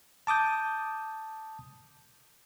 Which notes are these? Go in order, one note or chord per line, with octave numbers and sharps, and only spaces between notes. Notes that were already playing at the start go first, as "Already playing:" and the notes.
A5 D6 D#6 G6